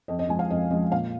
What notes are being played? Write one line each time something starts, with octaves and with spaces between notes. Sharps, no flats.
F2 D#5
D#5
F3 G#3 G#5
F5
F2 D#5
F3 G#3 D#5
A#2 F5